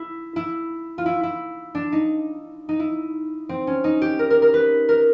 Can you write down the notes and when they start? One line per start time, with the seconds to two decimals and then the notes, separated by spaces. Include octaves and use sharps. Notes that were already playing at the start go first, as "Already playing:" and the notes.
Already playing: E4
0.36 E4
0.98 F4
1.06 E4
1.23 E4
1.75 D4
1.92 D#4
2.69 D#4
2.80 E4
3.49 C4
3.67 C#4
3.84 D#4
4.02 G4
4.19 A#4
4.30 A#4
4.42 A#4
4.54 B4
4.89 A#4